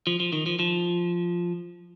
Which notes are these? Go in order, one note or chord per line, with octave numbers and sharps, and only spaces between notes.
F3
F3
D#3
F3
F3